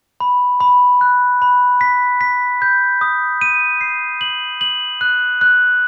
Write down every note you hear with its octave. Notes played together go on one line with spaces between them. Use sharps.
B5
B5
F#6
B5
B6
B6
G6
D#6
D#7
C7
F#7
F#7
F#6
F#6